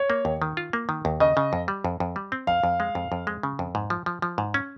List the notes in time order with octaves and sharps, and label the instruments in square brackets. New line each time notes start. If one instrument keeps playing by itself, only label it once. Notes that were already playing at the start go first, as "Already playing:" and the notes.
Already playing: [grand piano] C#5
[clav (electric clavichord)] A#3
D#2
D#3
F4
A#3
D#3
D#2
[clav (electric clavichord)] C#3 [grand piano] D#5
[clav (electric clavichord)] C#3
F2
G3
F2
F2
G3
C4
[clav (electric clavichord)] F2 [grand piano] F5
[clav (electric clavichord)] F2
G#3
F2
F2
G#3
C#3
F2
G#2
F3
F3
F3
G#2
C#4